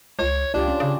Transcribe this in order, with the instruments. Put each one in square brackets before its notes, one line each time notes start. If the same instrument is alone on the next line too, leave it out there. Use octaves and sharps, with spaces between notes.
[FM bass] C#2 [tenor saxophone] C#5
[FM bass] C#2 [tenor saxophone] D4 [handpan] F4 G4 D5
[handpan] C#4
[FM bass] C#3